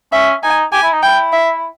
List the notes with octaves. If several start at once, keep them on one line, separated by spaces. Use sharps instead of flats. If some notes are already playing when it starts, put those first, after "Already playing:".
C#4 E5
D#4 G#5
G4 G#5
E4
D#4
E4 G5
E5